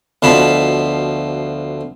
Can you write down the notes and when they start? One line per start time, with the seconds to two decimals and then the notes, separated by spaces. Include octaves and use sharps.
0.22 D2 B2 F3 A5 B5